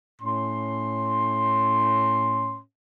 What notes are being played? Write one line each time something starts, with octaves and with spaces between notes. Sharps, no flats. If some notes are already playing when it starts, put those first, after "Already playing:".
A2 C#4 C6